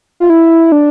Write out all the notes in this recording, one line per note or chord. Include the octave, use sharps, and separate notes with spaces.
F4
E4
D4